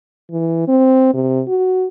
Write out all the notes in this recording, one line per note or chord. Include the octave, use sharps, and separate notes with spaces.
E3
C4
C3
F#4